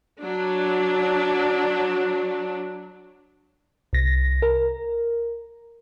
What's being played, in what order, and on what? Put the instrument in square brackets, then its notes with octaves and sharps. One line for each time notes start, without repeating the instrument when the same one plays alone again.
[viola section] F#3 D4
[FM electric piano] C2 A#6
A#4